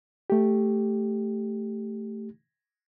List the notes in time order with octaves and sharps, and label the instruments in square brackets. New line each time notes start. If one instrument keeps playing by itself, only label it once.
[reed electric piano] A3 G4